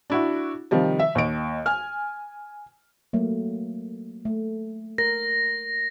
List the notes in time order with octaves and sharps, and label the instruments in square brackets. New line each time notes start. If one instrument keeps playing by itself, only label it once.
[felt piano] D4 E4 F#4
C3 D#3 F3 G3
E5
D#2 D#5 D7
G#5 F6
[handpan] F#3 A3 A#3
A3
[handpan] A#4 [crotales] A#6